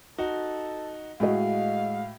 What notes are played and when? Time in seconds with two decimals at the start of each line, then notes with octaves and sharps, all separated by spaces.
0.18 D#4 F#4 A4
1.20 A2 G#3 F#4 D#5 F5